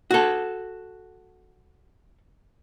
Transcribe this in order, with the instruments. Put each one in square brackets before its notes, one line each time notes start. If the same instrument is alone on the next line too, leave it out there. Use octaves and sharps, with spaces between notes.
[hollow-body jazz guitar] F#4 A4